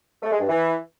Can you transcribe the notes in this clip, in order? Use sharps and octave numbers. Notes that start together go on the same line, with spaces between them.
A3
G#3
G2
E3